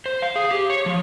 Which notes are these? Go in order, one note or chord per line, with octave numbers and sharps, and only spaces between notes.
C5
F5
G#4
G4
C#5
F3